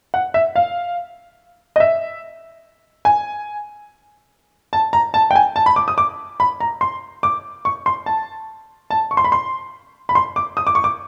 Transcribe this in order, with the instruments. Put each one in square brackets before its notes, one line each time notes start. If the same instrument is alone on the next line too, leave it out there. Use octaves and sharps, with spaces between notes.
[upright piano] F#5
E5
F5
D#5
E5
G#5
A5
A#5
A5
G5
G#5
A5
B5
D6
D#6
D6
B5
A#5
C6
D6
C#6
C6
A5
A5
C#6
C6
B5
C6
B5
C6
D6
D#6
D6
C#6
D6